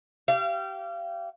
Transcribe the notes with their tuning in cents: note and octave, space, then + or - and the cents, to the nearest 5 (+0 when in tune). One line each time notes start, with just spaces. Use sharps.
G4 -25 F5 -35